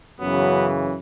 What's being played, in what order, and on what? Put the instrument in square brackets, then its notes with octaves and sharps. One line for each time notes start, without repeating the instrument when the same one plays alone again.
[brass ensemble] F#2 C#3 E3 F#3 B3